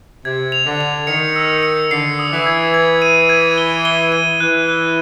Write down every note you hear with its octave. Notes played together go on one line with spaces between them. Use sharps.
C3 G#6
F7
D3
F7
D#3 C#7
E6
C#7
D3 C7
D#6
E3
G#6
G#6
D#7
G#6
G7
G7
D#7
E3 F#6
F#6